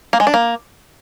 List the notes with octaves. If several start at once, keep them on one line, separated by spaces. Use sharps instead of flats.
A#3
G#3
D4
A#3